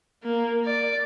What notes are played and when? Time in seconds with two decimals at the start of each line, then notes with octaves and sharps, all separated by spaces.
0.23 A#3
0.65 D5